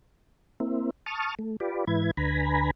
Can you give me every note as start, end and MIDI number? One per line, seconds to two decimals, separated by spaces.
0.60 0.90 58
0.60 0.90 60
0.60 0.90 64
1.06 1.35 81
1.06 1.35 85
1.06 1.35 87
1.06 1.35 89
1.39 1.56 57
1.60 1.85 65
1.60 1.85 67
1.60 1.85 71
1.60 1.85 74
1.87 2.11 44
1.87 2.11 52
1.87 2.11 64
1.87 2.11 71
1.87 2.11 92
2.17 2.71 38
2.17 2.71 50
2.17 2.71 71
2.17 2.71 80
2.17 2.71 82
2.17 2.71 83